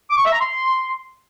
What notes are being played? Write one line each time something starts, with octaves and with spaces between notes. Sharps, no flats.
D6
C#6
E5
A#5
C6